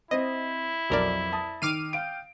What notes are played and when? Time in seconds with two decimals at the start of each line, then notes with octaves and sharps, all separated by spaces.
0.11 C4 E4 C5 D#5
0.90 B1 F2 F#3 A#4 D5
1.33 A5 D#6
1.62 D#3 D6 F6 C7 D#7
1.93 F5 G5 D7